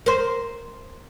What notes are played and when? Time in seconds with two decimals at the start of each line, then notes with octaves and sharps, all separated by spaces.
0.06 A#4 C5